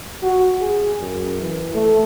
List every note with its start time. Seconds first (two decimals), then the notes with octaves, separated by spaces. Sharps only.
0.23 F#4
0.61 G#4
1.00 F#2
1.41 E3
1.74 A3